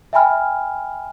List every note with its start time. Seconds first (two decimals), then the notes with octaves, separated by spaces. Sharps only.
0.13 E5 G5 G#5 B5 F6